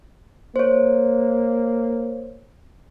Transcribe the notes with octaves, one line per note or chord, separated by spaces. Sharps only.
A#3 C5 C#5